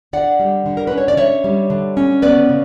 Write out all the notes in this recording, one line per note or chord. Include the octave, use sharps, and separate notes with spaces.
D3 D5 F#5
G3
D3
A#4
C#4 B4
C#5
D5
D3 C#5 E5
G3
D3
C#4
B3 B4 D5
C#3